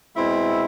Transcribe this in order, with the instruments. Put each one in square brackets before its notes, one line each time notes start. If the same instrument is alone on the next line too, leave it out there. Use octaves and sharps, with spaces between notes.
[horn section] B2 G#3 C4 E4